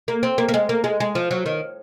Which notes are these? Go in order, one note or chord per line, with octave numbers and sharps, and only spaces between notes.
A#3
C4
A#3
A#3
G#3
A#3
G#3
G#3
F3
F#3
D#3